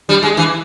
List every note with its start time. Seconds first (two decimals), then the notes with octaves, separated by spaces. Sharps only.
0.09 G3
0.23 G#3
0.37 E3